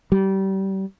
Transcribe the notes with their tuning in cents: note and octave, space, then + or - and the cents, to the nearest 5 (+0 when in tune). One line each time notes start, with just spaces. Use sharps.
G3 -25